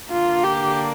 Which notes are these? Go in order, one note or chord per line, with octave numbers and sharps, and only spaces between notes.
D3 A#3 D4 F4
G4